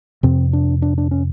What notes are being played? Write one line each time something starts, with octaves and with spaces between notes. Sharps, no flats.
F2 C3 C4
D4
D4
D4
C#4